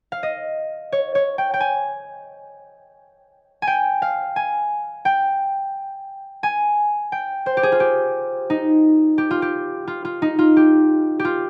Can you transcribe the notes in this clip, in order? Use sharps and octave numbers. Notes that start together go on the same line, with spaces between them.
F5
D#5
C#5
C#5
G5
G5
G#5
G#5
G5
F5
G#5
G5
G#5
G5
C5
G4
G#4
F4
G4
D#4
G4
F4
G4
F4
F4
D#4
F4
G4
G4
F4